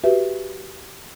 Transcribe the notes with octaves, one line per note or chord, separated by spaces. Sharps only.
F#4 G4 B4 E5